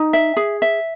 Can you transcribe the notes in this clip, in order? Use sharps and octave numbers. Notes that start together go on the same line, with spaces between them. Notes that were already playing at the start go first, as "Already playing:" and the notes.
Already playing: D#4
E5
G#4
E5